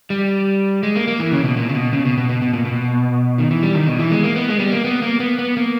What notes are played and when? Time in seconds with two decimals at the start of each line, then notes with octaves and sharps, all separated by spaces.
0.10 G3
0.83 G#3
0.96 A#3
1.08 A#3
1.20 E3
1.32 C#3
1.44 B2
1.57 A#2
1.70 C#3
1.75 B2
1.93 C#3
2.05 B2
2.18 B2
2.29 B2
2.42 B2
2.54 A#2
2.65 B2
3.38 D#3
3.51 E3
3.63 G3
3.75 D#3
3.87 B2
3.99 E3
4.11 G#3
4.23 A#3
4.36 B3
4.49 G#3
4.59 G3
4.72 A#3
4.84 B3
5.02 A#3
5.20 B3
5.39 B3
5.57 A#3